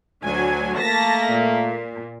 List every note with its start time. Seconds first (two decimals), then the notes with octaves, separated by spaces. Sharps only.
0.23 D2 F#3 G#5
0.79 A3 A#3 A5 A#6 B6
1.31 A#2